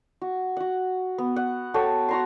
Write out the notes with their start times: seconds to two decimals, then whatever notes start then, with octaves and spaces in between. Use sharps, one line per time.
0.21 F#4
0.57 F#4 F#5
1.18 B3
1.36 F#5
1.74 F#4 A4 C#5 G5
2.09 F#4 A#5 C6